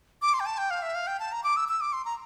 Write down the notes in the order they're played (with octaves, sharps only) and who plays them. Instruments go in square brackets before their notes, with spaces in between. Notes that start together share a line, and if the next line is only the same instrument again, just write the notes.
[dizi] D6
C6
G5
A5
G5
F5
E5
F5
G5
A5
A#5
D6
E6
E6
D6
C6
A#5